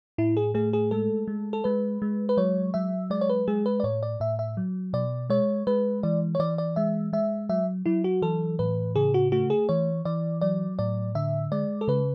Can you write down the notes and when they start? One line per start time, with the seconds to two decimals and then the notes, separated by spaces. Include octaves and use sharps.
0.18 A2 E4
0.37 G#4
0.54 A3 G#4
0.73 G#4
0.91 G#3 A4
1.28 G#3
1.53 A4
1.64 G#3 B4
2.02 G#3
2.29 B4
2.37 F#3 C#5
2.74 F#3 E5
3.10 G#3 D5
3.21 C#5
3.29 B4
3.48 G#3 G#4
3.66 B4
3.80 D5
3.84 A2 C#5
4.03 D5
4.20 A2 E5
4.39 E5
4.57 F#3
4.93 B2 D5
5.30 G#3 C#5
5.67 G#3 B4
6.03 E3 D5
6.35 C#5
6.39 E3 D5
6.58 D5
6.76 G#3 E5
7.13 G#3 E5
7.49 F#3 E5
7.86 F#3 E4
8.04 F#4
8.22 E3 A4
8.59 A2 B4
8.96 C#3 G#4
9.14 F#4
9.32 A3 F#4
9.50 G#4
9.69 E3 C#5
10.05 E3 D5
10.41 F#3 D5
10.79 A2 D5
11.15 D3 E5
11.52 G#3 D5
11.81 A4
11.88 C#3 B4